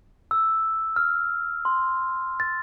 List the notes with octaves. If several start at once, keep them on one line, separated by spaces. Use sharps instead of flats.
E6
F6
C6
A6